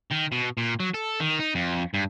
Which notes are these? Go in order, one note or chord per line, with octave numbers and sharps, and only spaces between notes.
D#3
B2
A#2
F#3
A4
D#3
D#4
F2
G2